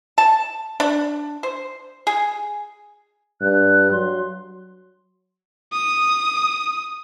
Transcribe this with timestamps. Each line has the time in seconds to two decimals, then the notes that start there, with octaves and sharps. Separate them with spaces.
0.18 A5
0.80 D4
1.43 C5
2.07 G#4
3.41 G2 F#6
3.92 F#3 C6
5.72 D#6